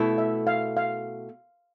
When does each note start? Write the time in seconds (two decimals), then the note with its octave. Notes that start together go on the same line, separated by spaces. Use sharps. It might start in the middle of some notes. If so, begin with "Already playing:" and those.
Already playing: B2 A3 E4
0.18 E5
0.47 F5
0.77 F5